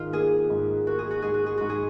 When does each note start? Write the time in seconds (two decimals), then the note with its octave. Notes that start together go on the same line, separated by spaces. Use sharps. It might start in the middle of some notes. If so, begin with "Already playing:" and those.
Already playing: G#2 D#3 F4
0.13 A#3 G#4
0.50 G#2
0.87 A#3 F#4
0.99 G#4
1.11 F#4
1.22 G#2 G#4
1.34 F#4
1.46 G#4
1.57 G#2 F#4
1.69 G#4